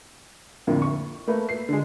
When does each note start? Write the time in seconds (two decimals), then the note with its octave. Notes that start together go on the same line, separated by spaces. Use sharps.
0.67 F2 A2 D3 A#3
0.82 C#6
1.27 A3 A#3 B4
1.49 C7
1.69 D3 G#3